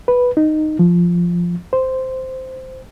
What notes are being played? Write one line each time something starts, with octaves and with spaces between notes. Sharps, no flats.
B4
D#4
F3
C5